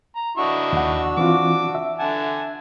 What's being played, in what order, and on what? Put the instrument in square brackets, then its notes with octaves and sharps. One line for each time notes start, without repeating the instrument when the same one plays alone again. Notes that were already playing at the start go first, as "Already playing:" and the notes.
[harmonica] A#5
[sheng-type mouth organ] D4 F#4 E6 [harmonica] E4 D#5 C#6
[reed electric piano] D#2 F#5
[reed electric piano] E3 C4 F4 [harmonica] D6
[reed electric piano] E5
[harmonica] D3 G#5 A5 [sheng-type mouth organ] F#5